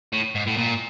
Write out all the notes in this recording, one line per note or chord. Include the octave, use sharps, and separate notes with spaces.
A2
G#2
A2
A#2